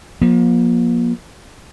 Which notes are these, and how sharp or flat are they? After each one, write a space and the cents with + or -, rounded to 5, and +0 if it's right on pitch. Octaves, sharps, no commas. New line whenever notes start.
F3 +30 A#3 +35